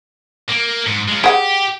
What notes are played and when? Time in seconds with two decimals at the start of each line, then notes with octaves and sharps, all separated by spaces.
0.49 A#3
0.86 G#2
1.08 G#3 F4
1.24 G4 G#4 F#5